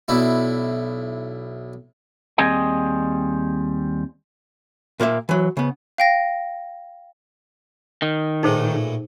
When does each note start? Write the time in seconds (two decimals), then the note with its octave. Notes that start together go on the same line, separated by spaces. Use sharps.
0.08 B1 D4 E4
2.38 D#2 G3 C4 G#4 D#5 G#5
5.00 A#2 A#3 B4 E5
5.29 E3 F#3
5.57 C#3 B3
5.98 F5 G5 A#6
8.02 D#3
8.43 A#1 A2 E3 D#4 G#4 C5